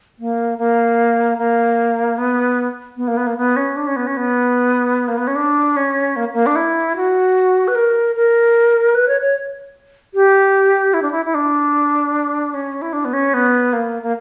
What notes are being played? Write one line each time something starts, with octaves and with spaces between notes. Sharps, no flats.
A#3
A#3
A#3
B3
B3
A#3
B3
A#3
B3
C#4
D4
C#4
B3
C#4
B3
A#3
B3
C#4
D4
C#4
A#3
A#3
D4
E4
F#4
B4
A#4
A#4
B4
C#5
C#5
G4
E4
D4
E4
E4
D4
C#4
E4
D4
B3
C#4
B3
A#3
A#3